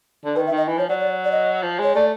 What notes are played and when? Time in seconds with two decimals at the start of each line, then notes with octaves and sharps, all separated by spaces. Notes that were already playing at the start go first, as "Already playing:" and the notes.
0.25 D3
0.36 D#3 B4
0.47 E5
0.51 D#3
0.57 D#5
0.68 E3
0.78 F3 C#5
0.89 F#3 D5
1.00 D5
1.25 D5
1.31 D#5
1.62 F3
1.79 G#3 C#5
1.95 A3 D5